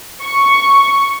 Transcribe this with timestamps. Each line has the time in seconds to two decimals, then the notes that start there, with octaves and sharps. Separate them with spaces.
0.23 C#6